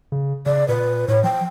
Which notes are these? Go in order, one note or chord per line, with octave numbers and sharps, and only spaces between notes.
C#3
C#3 D5
A#2 B4
A2 C#5
F3 G5